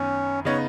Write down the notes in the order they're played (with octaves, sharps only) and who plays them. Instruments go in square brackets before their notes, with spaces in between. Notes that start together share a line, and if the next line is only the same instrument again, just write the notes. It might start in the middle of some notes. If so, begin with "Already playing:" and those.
Already playing: [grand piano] F#2 D#3 B3 [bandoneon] C#4
[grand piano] C#3 B3 D#4 [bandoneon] C#5